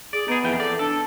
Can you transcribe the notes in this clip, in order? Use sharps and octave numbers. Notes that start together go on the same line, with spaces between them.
G#4 D5
B3 D#4 G#4
F2 E3 G5
A4 D5
D4 A4